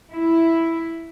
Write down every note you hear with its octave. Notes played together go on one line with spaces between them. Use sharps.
E4